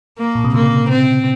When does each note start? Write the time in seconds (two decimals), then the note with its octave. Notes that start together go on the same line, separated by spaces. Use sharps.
0.18 A#3
0.35 A#2
0.44 C3
0.54 C#3 A#3
0.89 C4